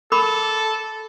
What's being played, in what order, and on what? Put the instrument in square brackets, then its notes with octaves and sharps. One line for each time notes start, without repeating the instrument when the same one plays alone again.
[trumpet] A4 [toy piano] A#4 B5 D6